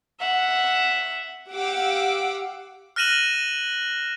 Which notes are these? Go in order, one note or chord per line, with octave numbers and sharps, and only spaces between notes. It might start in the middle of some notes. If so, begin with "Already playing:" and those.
E5 F#5
G4 F5 F#5 D6 E6
F6 F#6 A#6 D#7 E7 F#7